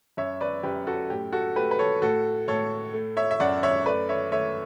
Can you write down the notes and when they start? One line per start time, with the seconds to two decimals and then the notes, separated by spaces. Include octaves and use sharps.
0.17 F#2 C#5 E5
0.41 B4 D5
0.63 F#2 G4 B4
0.87 F#4 A4
1.10 A2 G4
1.32 F#4 A4
1.56 A3 G4 B4
1.71 B4
1.79 A4 C#5
2.02 A2 F#4 A4
2.48 A2 A4 C#5
2.93 A3
3.17 C#5 E5
3.31 E5
3.40 F#2 D5 F#5
3.63 C#5 E5
3.86 A3 B4 D5
4.09 C#5 E5
4.32 A3 C#5 E5